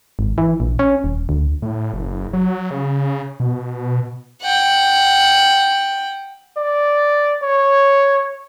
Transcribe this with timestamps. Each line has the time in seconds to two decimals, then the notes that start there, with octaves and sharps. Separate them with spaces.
0.19 G#1
0.38 E3
0.60 A#1
0.79 C#4
1.04 D#1
1.29 D2
1.62 A2
1.93 F#1
2.33 F#3
2.71 C#3
3.40 B2
4.42 F#5 G5
6.57 D5
7.43 C#5